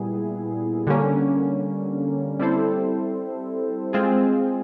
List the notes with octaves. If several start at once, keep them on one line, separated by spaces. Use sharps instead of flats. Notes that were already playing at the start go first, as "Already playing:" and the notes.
Already playing: A#2 G3 B3 E4 G#4
D3 G3 A#3 C#4
G3 C4 E4 A4 C5
G#3 C4 F4 G#4